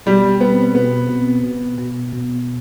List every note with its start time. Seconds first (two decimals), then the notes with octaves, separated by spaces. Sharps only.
0.06 B2 G3
0.40 B3 C4
0.75 B2 B3
1.09 B2
1.44 B2
1.78 B2
2.13 B2